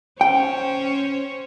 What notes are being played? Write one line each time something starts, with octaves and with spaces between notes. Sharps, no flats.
C#4 C5 C#5 G5